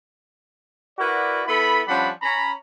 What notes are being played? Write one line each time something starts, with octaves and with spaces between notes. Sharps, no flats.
E4 F#4 A#4 B4 D5
B3 E4 A4 B5
F3 G3 C#4 D4 F#5 B5
C#4 A#5 B5